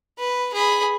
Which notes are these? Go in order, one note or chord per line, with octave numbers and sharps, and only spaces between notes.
B4
G#4 B5